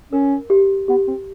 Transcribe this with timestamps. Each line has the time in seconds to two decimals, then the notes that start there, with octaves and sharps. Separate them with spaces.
0.12 C#4 A#4
0.50 G4
0.88 B3 G4
1.07 C4